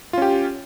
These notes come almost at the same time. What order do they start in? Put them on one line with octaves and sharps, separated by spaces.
F4 C#4 G4